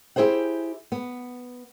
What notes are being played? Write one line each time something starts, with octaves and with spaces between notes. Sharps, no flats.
E4 G4 G#4 C5 F#5
B3